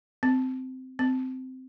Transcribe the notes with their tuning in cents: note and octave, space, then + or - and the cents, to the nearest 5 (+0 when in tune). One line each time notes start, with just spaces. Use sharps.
C4 -15
C4 -15